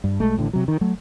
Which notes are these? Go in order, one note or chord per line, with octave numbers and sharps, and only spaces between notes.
G2
B1 G#3 A3
A1 A2 D3
C3 F#3
D#3
F#3 A3